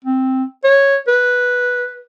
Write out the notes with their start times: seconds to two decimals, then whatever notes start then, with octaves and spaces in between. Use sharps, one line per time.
0.04 C4
0.64 C#5
1.08 B4